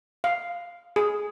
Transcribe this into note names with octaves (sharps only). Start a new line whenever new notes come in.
F5
G#4